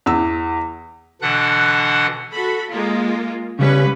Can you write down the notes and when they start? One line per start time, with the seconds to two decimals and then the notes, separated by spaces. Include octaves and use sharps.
0.06 E2 E6
1.22 B2 D3 E3 D4 F#5 F#6
2.33 F#4 A4 B5
2.70 G#3 A#3 F4
3.59 C#3 G3 C#4 B4